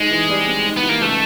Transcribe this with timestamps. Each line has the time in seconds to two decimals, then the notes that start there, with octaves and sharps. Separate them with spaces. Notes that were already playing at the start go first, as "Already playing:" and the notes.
Already playing: G#2 G#3
0.11 E3
0.29 G3
0.47 C4
0.65 G#2
0.76 B3
0.83 E3
0.89 A#3
1.01 C#2 A3